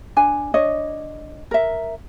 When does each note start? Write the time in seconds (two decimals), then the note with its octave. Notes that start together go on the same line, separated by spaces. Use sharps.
0.17 D4 G#5
0.54 D4 C#5 D#5
1.51 A#4 E5